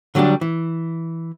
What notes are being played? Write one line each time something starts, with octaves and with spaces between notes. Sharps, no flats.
D3 F#3 G3 B3 D4
E3